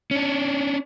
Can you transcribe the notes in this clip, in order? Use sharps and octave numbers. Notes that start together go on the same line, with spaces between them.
C#4 D4